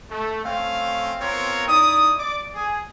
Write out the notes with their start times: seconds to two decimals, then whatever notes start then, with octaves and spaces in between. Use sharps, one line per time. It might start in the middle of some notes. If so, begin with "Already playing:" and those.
0.11 A3
0.44 A3 C4 C#4 F5
1.21 B3 C4 F4 A#4 C#5
1.68 D#4 E4 D5 D#6
2.19 D5 D6
2.55 G#4